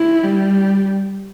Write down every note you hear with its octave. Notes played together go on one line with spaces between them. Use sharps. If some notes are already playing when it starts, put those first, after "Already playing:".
Already playing: E4
G3